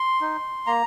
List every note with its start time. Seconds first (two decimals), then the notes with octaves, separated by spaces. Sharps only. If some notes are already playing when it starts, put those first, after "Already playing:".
Already playing: C6
0.21 D#4
0.67 A#3 A#5